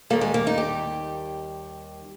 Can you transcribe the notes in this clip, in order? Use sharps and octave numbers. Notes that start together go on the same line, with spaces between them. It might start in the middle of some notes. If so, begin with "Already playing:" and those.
D#2 D#3 G3 A#3
G#3
A#3
D#4
G4